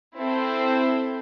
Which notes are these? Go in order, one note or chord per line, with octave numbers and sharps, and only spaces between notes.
C4 E4 A4 C5